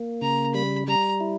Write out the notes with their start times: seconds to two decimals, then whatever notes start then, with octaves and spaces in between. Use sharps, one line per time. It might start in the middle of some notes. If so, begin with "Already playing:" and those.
Already playing: A#3
0.22 C#3 A#5
0.54 G3 B5
0.87 G3 A#5
1.20 E4